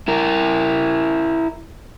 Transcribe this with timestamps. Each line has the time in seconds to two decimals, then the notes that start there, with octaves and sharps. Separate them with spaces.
0.08 E4 A#4